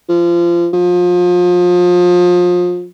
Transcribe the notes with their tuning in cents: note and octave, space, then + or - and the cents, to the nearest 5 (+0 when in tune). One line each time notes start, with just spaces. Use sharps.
F3 -25
F3 +30